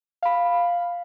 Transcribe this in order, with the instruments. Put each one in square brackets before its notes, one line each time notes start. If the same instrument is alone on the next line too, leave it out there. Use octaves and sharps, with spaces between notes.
[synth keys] F5 B5